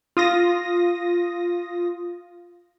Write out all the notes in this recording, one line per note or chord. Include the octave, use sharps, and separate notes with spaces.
F4 D#6 A#6